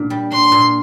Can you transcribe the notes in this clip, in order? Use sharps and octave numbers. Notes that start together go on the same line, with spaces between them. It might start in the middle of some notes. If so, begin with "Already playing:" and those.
Already playing: A#2 D4
G3
D4 C6
A#2